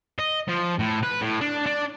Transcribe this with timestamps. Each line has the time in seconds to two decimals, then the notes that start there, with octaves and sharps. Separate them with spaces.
0.19 D#5
0.48 F3
0.79 A2
1.03 B4
1.21 A2
1.41 D4
1.66 D4